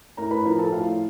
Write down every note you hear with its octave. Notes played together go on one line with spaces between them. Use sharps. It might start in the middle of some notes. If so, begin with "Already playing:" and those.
A2 A#4 A#5
B4 B5
F3 A#4 A#5
A4 A5
A2 F4 F5